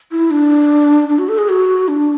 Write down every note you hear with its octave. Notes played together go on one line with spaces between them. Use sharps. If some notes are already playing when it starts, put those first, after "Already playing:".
E4
D4
D4
F#4
A4
G#4
F#4
D4